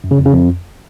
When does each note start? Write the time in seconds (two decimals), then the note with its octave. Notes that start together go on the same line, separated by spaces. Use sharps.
0.04 F#2
0.11 C#3
0.18 F2
0.25 C#3
0.33 F2